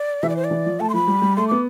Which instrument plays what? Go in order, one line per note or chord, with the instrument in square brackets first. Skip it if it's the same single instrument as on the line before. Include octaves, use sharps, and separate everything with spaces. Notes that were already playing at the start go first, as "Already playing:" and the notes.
Already playing: [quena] D5
[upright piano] E3 [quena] E5
[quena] D5
C5
D5
[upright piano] E3
F3
[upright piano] A3 [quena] A5
[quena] C6
[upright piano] F3 [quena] B5
[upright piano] G3
G3
[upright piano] A3 [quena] C6
[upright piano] B3 [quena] D6